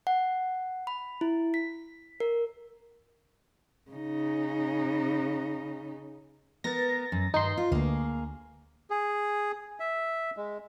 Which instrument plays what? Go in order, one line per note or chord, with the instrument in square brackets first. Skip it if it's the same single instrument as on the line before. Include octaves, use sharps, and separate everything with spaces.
[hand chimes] F#5
B5
E4
B6
A#4
[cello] C#3 D#4
[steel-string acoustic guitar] B3 A#4 [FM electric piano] A6 A#6
[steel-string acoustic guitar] F#2
[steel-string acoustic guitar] G2 D#3 [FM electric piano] D#4 C6
[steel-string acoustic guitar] F4
[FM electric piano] D2 [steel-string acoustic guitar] A#3 G#4
[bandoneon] G#4
E5
G#3